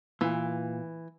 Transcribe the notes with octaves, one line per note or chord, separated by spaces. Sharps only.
A#2 E3